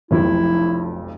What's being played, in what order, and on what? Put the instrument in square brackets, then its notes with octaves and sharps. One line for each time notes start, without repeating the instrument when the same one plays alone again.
[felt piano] F1 B1 F2 [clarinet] E4